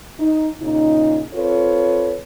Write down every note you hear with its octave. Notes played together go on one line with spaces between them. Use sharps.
D#4
A#2 C#3 D#4
C4 F4 A4 B4 C#5